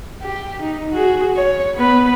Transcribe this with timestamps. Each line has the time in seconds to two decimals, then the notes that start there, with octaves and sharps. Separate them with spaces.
0.23 G4
0.62 D#4
0.92 F#4 G#4
1.35 C#5
1.75 B3 B4